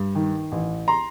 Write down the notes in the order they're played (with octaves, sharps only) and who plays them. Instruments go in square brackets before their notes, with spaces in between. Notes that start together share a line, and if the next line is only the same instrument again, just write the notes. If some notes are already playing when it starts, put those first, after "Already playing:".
Already playing: [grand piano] G2
D#3
A1
A#5 C6